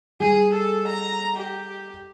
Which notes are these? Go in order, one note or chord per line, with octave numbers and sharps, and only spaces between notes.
G3 G#4
A4
A#5
G4